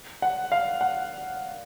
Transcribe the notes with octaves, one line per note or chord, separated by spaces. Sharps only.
F#5
F5
F#5